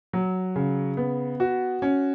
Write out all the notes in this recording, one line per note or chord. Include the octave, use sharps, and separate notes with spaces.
F#3
C#3
B3
F#4
C#4